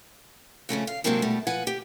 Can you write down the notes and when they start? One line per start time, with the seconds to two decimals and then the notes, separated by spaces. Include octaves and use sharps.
0.69 F2 C#3 A3 C#4
0.87 F5
1.04 G#2 C3 F#3 A#3 C4 D4
1.22 B2 G3 A3
1.47 F3 B4 F#5 G#5
1.67 G4